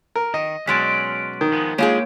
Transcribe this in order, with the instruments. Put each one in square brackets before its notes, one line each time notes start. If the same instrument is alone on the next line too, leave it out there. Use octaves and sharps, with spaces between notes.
[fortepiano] A#4
[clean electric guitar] D#3 [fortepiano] D#5
[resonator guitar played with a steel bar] B2 F#3 G#3 [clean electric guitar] C#4 D5 [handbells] C6 F#6 B6
[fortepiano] D#3
[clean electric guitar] F3 G#3 B3
[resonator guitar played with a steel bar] G#3 F4 G#4 [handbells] A#3 C#5 [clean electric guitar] G4